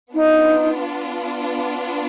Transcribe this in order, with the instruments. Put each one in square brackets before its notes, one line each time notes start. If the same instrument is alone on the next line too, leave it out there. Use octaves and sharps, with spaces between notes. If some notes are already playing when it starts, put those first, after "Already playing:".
[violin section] B3 D4 F4 [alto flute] D#4